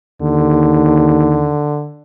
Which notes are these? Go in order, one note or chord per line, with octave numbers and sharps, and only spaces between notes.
D#2 D3